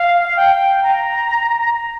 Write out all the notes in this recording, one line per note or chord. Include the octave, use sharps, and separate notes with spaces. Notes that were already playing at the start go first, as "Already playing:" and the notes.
Already playing: F5
G5
A#5
A#5